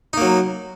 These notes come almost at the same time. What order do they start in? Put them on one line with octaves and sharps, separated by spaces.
D#4 A#3 F#3